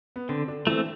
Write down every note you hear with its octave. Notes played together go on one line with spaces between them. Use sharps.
B3
D3 C4
D3 D4
E3 A3 C4 E4